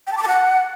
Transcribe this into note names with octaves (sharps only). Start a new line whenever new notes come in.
G5
A5
D6
A5
F#5